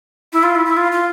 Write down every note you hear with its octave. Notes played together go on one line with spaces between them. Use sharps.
E4
F4
E4
E4
F4
F4